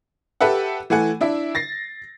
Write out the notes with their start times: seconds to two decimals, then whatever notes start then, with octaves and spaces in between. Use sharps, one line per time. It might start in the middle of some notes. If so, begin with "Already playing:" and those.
0.41 G4 A4 B4 E5 F#5
0.90 E3 A3 F#5 G#5
1.21 D4 E4 E5
1.55 A6 A#6 C7